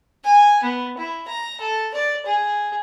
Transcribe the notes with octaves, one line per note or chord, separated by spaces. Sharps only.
G#5
B3
E4
A#5
A4
D5
G#4